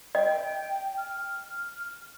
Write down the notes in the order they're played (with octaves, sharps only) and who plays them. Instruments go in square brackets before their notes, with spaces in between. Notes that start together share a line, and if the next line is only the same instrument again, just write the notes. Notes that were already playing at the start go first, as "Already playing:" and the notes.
[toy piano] D#5 [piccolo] G5
[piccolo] F6